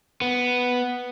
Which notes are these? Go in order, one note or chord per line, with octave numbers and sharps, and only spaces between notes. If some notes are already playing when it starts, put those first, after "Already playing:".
B3